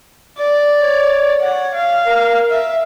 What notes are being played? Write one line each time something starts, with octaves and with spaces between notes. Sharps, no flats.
D5
C#5
F#5
F5
A#4
E5